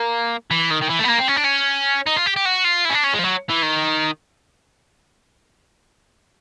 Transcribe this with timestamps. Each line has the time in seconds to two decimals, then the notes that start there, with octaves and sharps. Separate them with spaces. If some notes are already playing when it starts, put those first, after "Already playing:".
Already playing: A#3
0.51 E3
0.71 D#3
0.82 D#3
0.90 E3
1.00 A3
1.05 B3
1.09 A#3
1.20 C4
1.29 C#4
1.37 D4
1.45 C#4
2.06 D#4
2.16 F4
2.26 G4
2.36 G4
2.45 F#4
2.64 F4
2.85 E4
2.90 C#4
2.94 D4
3.04 C#4
3.14 G#3
3.19 F3
3.24 F#3
3.49 E3
3.62 D#3